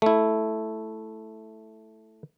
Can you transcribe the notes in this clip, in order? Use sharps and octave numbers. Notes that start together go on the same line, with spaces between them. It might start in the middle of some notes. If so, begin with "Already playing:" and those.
A3 E4